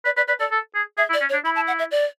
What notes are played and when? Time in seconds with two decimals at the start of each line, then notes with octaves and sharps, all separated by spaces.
0.05 B4 D5
0.17 B4 D5
0.28 B4 D5
0.39 A4 D5
0.51 A4
0.75 G#4
0.98 G#4 E5
1.10 E4
1.13 D5
1.21 C#4
1.29 C#5
1.33 D4
1.44 E4 B5
1.56 A5
1.67 F#5
1.79 E5
1.91 D5